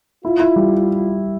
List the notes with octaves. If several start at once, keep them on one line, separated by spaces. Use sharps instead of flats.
E4 F4
E4
G3